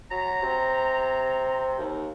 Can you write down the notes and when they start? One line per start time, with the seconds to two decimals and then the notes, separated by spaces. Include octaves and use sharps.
0.11 F#3 A#5
0.42 C3
1.79 D#2